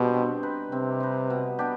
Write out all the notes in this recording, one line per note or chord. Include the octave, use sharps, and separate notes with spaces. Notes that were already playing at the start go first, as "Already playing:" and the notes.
Already playing: B2 G3 D4 G4 C5
C4
D#4 B4
C3 C4
D#4 B4
B2
B3 D4 G4